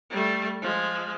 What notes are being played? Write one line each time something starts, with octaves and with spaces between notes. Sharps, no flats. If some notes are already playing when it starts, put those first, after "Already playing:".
G3 A3
F3 G#3